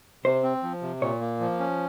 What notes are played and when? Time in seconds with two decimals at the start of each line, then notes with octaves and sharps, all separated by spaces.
0.24 C3 C5
0.43 C4
0.63 F3
0.82 C3
1.01 A#2 C#5
1.21 A#3
1.40 F3
1.60 C#4